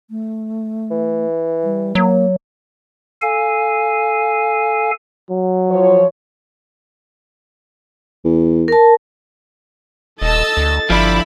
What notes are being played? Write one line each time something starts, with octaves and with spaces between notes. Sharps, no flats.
A3
E3
G3
F#3 A#3
A4 F5 G#5
F#3
F3 C#5
E2
A#4 A5
D#1 A4 D#5 A5 E6 A6
D2
G1 F3 D4 E4 B5